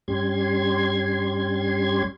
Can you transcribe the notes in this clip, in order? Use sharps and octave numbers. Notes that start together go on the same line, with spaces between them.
G2 G3 C#4 G4 C6 G#6